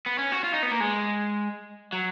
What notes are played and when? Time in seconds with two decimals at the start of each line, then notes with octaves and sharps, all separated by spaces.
0.06 B3
0.18 C#4
0.32 F#4
0.44 F4
0.54 D#4
0.63 B3
0.72 A#3
0.80 G#3
1.93 F#3